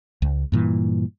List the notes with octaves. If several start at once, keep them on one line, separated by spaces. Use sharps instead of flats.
C#2
G2 A#2 E3